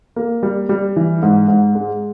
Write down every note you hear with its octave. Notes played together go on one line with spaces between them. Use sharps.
A#3
G3
G3
E3
G#2
G#2
G#3